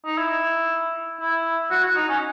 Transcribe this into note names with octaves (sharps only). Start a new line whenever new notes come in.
D#4
E4
E4
F#4
F#4
D#4
C#4